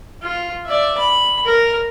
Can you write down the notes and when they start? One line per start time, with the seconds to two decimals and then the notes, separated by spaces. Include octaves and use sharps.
0.22 F4
0.65 D5 E5
0.98 B5
1.45 A#4